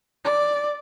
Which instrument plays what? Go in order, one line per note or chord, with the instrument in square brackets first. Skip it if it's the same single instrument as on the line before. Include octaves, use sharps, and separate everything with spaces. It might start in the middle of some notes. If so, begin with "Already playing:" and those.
[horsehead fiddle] D5